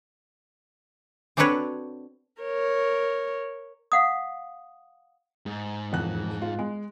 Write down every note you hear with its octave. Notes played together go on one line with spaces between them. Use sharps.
C4 D4 F#4 A4 B4 C#5
A#4 C#5
F5 F#5 D#6
G#2
E1 F2 F#6
F4
G#3